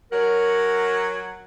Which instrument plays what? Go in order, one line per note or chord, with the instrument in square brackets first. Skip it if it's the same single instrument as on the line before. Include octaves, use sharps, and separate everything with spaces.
[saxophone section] F#3 C#4 F#5 [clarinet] A#4